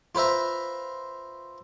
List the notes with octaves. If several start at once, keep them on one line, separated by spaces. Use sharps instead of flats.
F4 B4 C5 E5 A#5